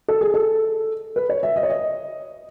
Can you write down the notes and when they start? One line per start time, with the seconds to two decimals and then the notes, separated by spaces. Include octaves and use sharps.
0.08 A4
0.21 G#4
0.34 A4
1.16 B4
1.29 C#5
1.43 E5
1.56 D#5
1.63 C#5
1.70 D#5